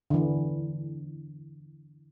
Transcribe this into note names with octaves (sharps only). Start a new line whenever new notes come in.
D3 E3